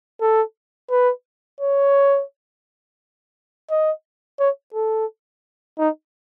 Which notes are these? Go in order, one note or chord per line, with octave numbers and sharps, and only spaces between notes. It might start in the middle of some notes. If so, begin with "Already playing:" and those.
A4
B4
C#5
D#5
C#5
A4
D#4